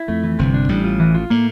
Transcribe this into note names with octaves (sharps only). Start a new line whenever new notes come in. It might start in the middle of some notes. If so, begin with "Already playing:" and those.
Already playing: E4
F2 A3
E3
G1 G2 C3
D4
A1 A2 G3
F4
E3
F4
A2 A#3